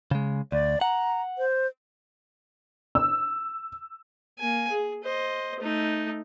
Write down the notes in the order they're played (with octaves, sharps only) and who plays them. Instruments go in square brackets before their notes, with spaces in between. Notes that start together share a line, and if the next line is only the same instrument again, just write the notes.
[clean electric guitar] C#3 G#3
[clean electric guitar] D2 [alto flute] D5
[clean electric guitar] F#5 [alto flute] A#5
[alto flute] C5
[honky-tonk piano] E6
[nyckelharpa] A#3 G#5
G#4
C5 D#5
A3 D#4